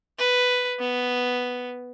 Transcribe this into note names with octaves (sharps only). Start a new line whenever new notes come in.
B4
B3